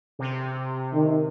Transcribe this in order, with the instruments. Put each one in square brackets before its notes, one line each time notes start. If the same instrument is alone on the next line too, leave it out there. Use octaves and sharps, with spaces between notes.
[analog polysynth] C3
[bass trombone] D#3